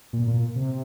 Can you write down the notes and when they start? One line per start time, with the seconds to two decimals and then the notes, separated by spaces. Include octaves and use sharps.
0.13 A#2
0.27 A#2
0.56 C3